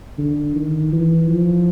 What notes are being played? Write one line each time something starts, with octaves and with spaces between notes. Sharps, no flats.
D3
D#3
E3
F3